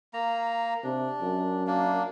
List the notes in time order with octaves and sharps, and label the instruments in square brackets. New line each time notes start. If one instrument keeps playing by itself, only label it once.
[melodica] A#3 A#5
[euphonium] C3 [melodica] D4
[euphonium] F#2
[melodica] A#3 D4